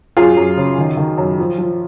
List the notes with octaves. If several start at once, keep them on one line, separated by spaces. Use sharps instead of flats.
F#2 F4 G#4
F#2
C#3
D#3
D#3
F#2
F3
F3